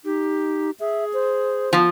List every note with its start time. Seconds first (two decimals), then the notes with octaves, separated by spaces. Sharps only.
0.05 D#4 G4
0.80 G#4 E5
1.14 C5
1.73 F3 B3